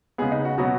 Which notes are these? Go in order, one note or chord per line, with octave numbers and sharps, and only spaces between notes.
C#3 G#3 B3 G#4
D#4
F#4
B2 F#3 B3 F#4